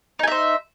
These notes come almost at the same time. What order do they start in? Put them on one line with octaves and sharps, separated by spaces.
D#4 G#5 E5 C5